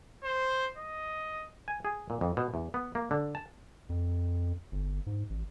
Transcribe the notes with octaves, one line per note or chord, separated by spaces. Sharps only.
C5
D#5
G#5
G#4
A#2
F2
B2
E2
B3
A#3
D3
A5
F2
G1
G#2
A1